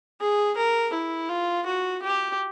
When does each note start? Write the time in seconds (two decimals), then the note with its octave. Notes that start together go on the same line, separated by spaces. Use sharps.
0.21 G#4
0.57 A#4
0.93 E4
1.29 F4
1.66 F#4
2.02 G4